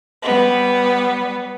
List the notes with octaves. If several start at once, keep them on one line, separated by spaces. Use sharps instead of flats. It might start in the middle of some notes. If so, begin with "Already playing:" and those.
G3 B3